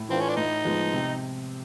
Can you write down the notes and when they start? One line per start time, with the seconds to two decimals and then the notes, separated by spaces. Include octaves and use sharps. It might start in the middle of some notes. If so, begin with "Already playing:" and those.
Already playing: A2
0.09 E3 A3 C4 D4 F4
0.20 C#4
0.28 D4
0.37 A2 D#4
0.65 F3 G#3 B3
0.93 C3